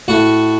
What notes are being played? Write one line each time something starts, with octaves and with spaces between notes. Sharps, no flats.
A2 F#4